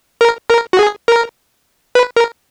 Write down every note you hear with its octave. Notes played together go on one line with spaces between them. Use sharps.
A#4
A#4
F#4
G#4
A#4
B4
A#4